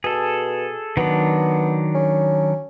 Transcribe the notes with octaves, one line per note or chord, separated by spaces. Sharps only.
B2 G#4 A4
D#3 F#3 B3 D4
C#4